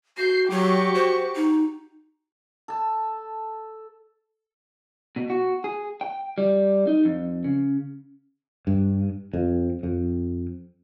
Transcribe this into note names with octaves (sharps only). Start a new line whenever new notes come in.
F#4 G6 C7
F#3 F#4 G4 C#6
C5
D#4
A4 A5
B2
F#4
G#4
G5
G3
D#4
F2
C#3
G2
F2
F2